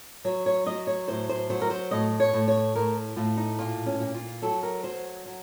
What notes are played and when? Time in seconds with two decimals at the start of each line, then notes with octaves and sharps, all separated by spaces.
0.25 F#3 C#5
0.46 C#5
0.66 F#3 D#5
0.87 C#5
1.08 A2 C5
1.29 C5
1.50 F#3 C5
1.61 A#4
1.70 C5
1.91 A2 D#5
2.20 C#5
2.33 A2
2.48 C#5
2.75 A2 A#4
3.16 A2 F4
3.37 D#4
3.59 A#2 F4
3.86 C#4
4.00 A#2
4.14 F4
4.42 F#3 A4
4.63 A#4
4.84 F#3 C5
5.26 F#3